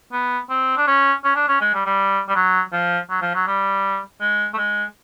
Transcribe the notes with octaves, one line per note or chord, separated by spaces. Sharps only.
B3
C4
D4
C#4
C#4
D4
C#4
G#3
G3
G3
G3
F#3
F3
F#3
F3
F#3
G3
G#3
A3
G#3